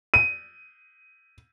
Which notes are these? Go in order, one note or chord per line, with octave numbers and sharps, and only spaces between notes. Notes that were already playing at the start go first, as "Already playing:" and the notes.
D#7